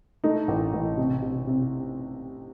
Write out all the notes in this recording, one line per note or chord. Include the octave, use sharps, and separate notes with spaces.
A3 D#4
A1
A1
C3
C3
C3